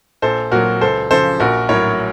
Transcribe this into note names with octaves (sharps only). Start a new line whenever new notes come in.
A#1 A4 C5
A#2 F#3 F#4 A#4
C#2 A4 C5
C#3 F3 A4 C5
A#1 F#4 A#4
A2 F#3 A#4 C#5